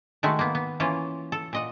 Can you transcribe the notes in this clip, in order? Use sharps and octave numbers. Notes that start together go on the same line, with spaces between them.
D#3 G#3 A3 F#4
A#3 B3
B3
E3 A#3 C#4 F4
A4
A#2 D#5 F#5